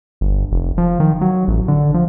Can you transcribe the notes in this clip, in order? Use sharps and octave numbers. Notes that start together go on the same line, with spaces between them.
G1
F1
F3
D#3
F#3
A1
D3
F3